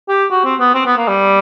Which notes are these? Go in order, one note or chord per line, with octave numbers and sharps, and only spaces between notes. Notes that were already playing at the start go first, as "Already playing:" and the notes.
G4
F#4
C4
B3
C4
B3
A#3
G3